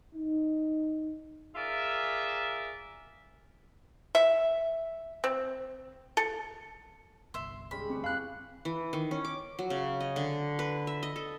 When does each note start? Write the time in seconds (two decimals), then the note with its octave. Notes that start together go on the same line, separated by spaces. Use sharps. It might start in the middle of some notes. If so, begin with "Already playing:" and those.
0.15 D#4
1.55 F4 G#4 A#4 D5 E5
4.15 E5
5.24 C4
6.17 A4
7.34 G1 C2 E5 C6
7.71 G3 G#3 C#4 B5
7.90 D2 C4 B4 C#6 D6
8.04 F2 E3 C4 F5 A5 F#6
8.65 E3
8.93 D#3
9.11 C#4
9.25 D6
9.59 F#3
9.70 C#3
10.00 D#5
10.16 D3
10.59 B4
10.87 E5
11.03 D#5
11.16 A4